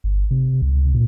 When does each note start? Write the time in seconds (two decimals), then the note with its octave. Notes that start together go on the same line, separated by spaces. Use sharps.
0.04 G1
0.31 C3
0.62 C#2
0.94 A#2